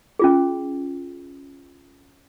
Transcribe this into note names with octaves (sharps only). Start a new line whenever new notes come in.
C#4 F4 G#4